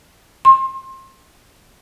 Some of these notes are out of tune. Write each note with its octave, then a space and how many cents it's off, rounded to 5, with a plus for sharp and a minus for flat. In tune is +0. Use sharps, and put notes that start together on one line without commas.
C6 +30